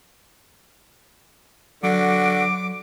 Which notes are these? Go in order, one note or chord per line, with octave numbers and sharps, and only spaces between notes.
D3 F#3 F#4 D6